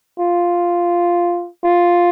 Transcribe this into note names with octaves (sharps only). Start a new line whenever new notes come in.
F4
F4